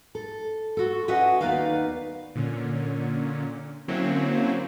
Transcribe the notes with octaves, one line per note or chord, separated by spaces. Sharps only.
A4
F#4 A4
C#4 F#4 B4 D#5 E5 F#5
D#2 B3 D#4 B4 D5 F5
A#2 D3 C#4
D3 F#3 A#3 C4 C#4 E4